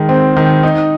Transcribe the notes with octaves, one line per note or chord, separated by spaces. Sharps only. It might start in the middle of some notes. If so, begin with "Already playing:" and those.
Already playing: D#3 G#3
C4
D#3
D#4